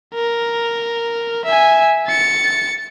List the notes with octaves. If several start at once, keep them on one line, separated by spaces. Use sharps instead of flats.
A#4
E5 G#5
A6 C#7